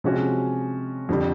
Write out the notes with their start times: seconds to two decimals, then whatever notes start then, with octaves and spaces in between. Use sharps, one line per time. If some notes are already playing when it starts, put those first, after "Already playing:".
0.04 C3 F3 G#3 C#4 F#4
1.09 F2 D3 G3